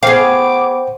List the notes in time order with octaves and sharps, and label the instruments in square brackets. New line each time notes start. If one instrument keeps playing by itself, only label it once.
[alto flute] B3 [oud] G#4 F5 [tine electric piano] C5 G5 [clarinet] D6